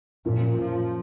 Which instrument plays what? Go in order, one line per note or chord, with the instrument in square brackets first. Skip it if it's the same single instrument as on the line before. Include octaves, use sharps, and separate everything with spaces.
[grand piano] F#2 F3 A#3 [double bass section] A#2
[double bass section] F3